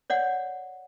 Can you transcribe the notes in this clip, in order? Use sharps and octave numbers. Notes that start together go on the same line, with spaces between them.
C#5 D5 F#5